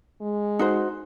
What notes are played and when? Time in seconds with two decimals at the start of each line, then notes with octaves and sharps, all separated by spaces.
0.21 G#3
0.59 D#4 F#4 C5